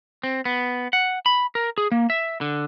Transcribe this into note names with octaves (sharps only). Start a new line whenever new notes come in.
C4
B3
F#5
B5
A#4
G#4
A#3
E5
D3